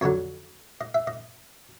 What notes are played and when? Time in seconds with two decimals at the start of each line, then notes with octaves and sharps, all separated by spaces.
0.01 F2 D3 F#3 C#5
0.81 D#5
0.94 E5
1.07 D#5